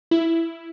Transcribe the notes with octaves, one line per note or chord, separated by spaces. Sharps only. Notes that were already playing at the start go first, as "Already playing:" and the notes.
E4